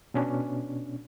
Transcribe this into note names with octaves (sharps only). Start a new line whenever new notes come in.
B2 C#4 D4